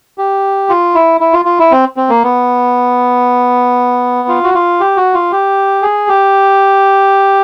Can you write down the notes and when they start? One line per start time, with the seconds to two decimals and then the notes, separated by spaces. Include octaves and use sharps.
0.18 G4
0.69 F4
0.95 E4
1.21 E4
1.33 F4
1.45 F4
1.59 E4
1.71 C4
1.97 C4
2.09 A#3
2.23 B3
4.28 F4
4.44 F#4
4.54 F4
4.80 G4
4.97 F#4
5.14 F4
5.32 G4
5.82 G#4
6.08 G4